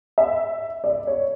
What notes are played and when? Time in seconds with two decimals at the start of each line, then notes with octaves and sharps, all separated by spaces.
0.18 E5
0.84 D5
1.07 C#5